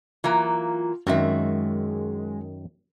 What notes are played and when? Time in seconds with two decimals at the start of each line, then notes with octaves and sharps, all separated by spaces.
0.24 E3 F#3 A#3 F4
1.07 F#2 D#3 G#3 C4 F#4 E5